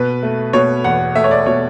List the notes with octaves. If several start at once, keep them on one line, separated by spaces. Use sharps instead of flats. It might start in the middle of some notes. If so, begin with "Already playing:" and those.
Already playing: B2 B4
A3
B2 C#5
E2 F#5
A3 E5
C#5
D5
B2 C#5